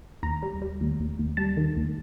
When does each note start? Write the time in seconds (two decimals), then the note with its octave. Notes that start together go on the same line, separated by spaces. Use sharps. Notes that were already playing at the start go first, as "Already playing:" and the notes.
0.23 D#2 A#5
0.43 G3
0.62 G3
0.81 D#2
1.00 D#2
1.19 D#2
1.37 G3 A5
1.57 D#3
1.76 D#2